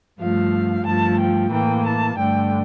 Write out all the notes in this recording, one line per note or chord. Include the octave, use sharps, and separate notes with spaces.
G2 F3 A3 F5
G2 F3 A3 A5
G5
A2 E3 A#3 G5
A5
G2 D3 A3 G5